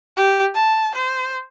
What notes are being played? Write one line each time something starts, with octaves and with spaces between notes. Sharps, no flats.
G4
A5
C5